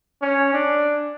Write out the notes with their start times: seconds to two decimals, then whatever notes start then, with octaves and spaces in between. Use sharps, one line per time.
0.22 C#4
0.54 D4